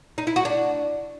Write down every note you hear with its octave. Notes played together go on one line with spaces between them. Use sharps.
D#4
E4
F#4
D4